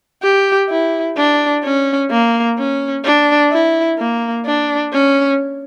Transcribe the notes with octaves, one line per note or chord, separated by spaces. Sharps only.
G4
E4
D4
C#4
A#3
C#4
D4
E4
A#3
D4
C#4